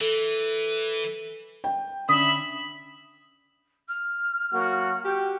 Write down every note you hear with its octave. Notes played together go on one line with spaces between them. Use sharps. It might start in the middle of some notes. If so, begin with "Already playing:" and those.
E3 A4
G5
D3 C#4 E5 B5 D#6
F6
F#3 A#3 F#4
F#4 G4 G5